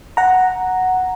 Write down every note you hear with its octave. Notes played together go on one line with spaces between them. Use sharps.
F#5 A#5